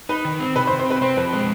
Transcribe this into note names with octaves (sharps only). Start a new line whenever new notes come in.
D#4 B4
D#3
C4
C3 B4
C5
C3
C5
C4 B4
C4 C5
F2 B4
G#3 B4